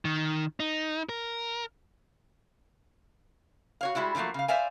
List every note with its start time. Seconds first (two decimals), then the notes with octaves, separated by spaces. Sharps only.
0.05 D#3
0.60 D#4
1.09 A#4
3.81 F#4 C#5 F5
3.95 G3 G#3 E4 F#4
4.15 D3 F3 F#3 A3 A#3
4.34 C#3 F5
4.48 C5 D5 E5 F5 G#5